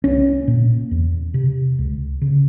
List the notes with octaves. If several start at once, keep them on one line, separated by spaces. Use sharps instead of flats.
C2 C#4
A#2
E2
C3
C#2
C#3